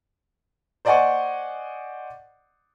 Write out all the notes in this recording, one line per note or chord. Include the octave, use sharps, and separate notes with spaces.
C5 D5 D#5 F#5 G#5 C#6